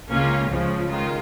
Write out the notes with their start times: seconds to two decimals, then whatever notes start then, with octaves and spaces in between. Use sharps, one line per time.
0.10 C#2 C#3 A#3 C#4 F4
0.50 C#2 C#3 F3 G#3
0.90 D#3 G#3 F4